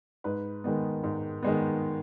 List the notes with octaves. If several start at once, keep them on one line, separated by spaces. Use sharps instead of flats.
G#2 B4
D#3 G#3 B3
G#2
D#3 G#3 B3